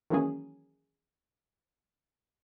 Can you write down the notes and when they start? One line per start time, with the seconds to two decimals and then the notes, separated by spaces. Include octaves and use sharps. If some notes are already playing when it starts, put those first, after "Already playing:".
0.10 D#3 E3 F#3 A#3 C#4 G#4